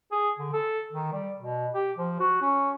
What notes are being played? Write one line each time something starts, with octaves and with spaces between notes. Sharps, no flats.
G#4
D3
A4
D#3
G3
B2
G4
F3
F#4
C#4